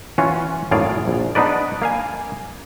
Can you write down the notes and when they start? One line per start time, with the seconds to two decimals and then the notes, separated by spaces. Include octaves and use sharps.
0.18 E3 C#4 F4 F#4
0.71 G#1 F#2 A2 G#4 D5 F5
1.08 A#1
1.35 B3 D4 D#4 B4 D5
1.82 A#3 F5 G#5